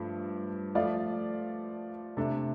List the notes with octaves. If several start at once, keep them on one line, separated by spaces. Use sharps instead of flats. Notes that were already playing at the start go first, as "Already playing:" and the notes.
Already playing: G2 F3 A3
F3 A3 F4 D5 F5
C3 A3 D4 A4